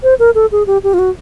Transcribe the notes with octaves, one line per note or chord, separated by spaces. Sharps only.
C5
A#4
A4
G#4
G4
G4
F4
F#4